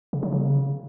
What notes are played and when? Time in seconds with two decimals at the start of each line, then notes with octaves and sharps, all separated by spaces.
0.13 C#3
0.23 F#3
0.32 C#3